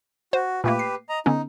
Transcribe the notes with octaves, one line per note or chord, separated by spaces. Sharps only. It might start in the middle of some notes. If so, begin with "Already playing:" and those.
F#4 C5
A#2 A3 A#3 G4 B4
C7
D#5 A#5
D3 B3 C#4 D#4